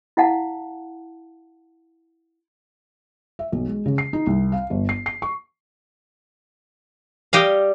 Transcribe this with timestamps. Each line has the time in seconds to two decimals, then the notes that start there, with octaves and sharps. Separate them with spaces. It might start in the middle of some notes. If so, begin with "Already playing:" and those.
0.17 E4 F5 F#5 A5
3.39 E5
3.52 B1
3.67 G#3
3.86 C#3
3.98 C7
4.13 D#4
4.27 C2
4.52 F5
4.70 G1
4.89 C7
5.06 C7
5.22 C#6
7.33 G3 G4 D#5 F5